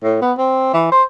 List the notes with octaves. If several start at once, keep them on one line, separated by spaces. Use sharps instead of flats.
A2
B3
C4
E3
C5